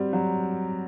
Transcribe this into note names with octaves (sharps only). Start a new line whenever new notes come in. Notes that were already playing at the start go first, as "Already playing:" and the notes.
Already playing: G3 C4 F#4
F#3